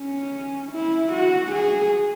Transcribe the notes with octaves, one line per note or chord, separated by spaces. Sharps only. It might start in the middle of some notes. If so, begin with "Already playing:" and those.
Already playing: C#4
E4
F#4
G#4